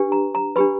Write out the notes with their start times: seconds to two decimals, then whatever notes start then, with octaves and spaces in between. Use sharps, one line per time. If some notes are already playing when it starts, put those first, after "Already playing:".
Already playing: D4 G4 B4
0.12 A#5
0.35 A#5
0.56 D4 G4 B4 B5